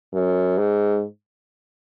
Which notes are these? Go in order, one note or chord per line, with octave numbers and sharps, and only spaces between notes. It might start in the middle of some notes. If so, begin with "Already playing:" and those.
F#2
G#2